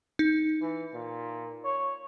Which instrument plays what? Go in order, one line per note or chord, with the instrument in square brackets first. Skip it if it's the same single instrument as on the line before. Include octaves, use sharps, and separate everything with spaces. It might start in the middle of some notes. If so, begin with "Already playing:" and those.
[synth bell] D#4
[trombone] E3
A#2
C#5